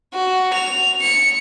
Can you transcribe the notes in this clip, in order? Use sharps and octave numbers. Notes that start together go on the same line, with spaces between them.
F#4
F7
C#7